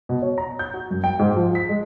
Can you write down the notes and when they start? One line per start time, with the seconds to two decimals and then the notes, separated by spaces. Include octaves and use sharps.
0.09 B2
0.22 C#5
0.38 A#5
0.59 G6
0.74 F#4
0.91 F#2
1.04 G5
1.19 G#2
1.36 F3
1.55 B6
1.69 G#3